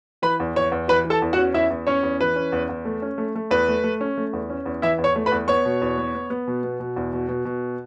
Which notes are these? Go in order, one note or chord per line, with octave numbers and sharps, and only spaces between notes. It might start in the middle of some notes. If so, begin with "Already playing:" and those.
E3 B4 B5
E2
E3 C#5 C#6
E2
E3 B4 B5
E3
A4 A5
E2
F#4 F#5
C#4
E2 E4 E5
E2
C#4 C#5
E2
E3 B4
C#4
E2
E2
A3
C#4
A3
A3
E2 B4
A3
A3
C#4
A3
E2
C#4
E2
E3 E4 E5
E2
C#5 C#6
A3
B4 B5
E2
B3 C#5 C#6
B2
E2
B3
B3
B3
B2
B3
B2
E2
B2
B2
B2